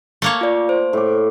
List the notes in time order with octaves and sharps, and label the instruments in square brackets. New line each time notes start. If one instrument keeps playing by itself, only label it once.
[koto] A3 A#3 C#5
[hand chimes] F4 D5
C5
[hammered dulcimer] A2 D6